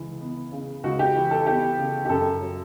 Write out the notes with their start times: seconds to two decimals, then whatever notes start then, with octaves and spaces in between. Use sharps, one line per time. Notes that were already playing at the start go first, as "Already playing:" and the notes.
Already playing: C#2 E3
0.21 B3
0.52 C#3
0.83 C#2 F#4
0.99 G4
1.15 E3
1.31 A4
1.46 B3 G4
1.78 C#3
2.05 G4
2.09 F#2 A4
2.41 F#3